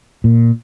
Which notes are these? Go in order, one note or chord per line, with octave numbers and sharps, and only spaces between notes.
A#2